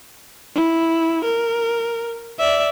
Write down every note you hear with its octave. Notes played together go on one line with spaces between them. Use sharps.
E4
A#4
D5 E5